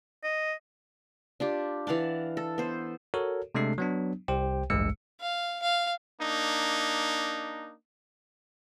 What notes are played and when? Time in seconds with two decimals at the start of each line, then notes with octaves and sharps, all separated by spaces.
0.23 D#5
1.40 D4 F4 G4
1.87 E3 F5 F#5 A5
2.37 A4
2.58 B3 C5
3.14 F#4 A4 A#4 C#5
3.55 C3 G#3 A3 D4 A4 C7
3.78 F#3 B3 D4
4.28 C2 G4 C5 G5
4.70 A1 D2 G2 G#3 E6 C#7
5.20 F5
5.62 F5
6.19 A#3 D4 D#4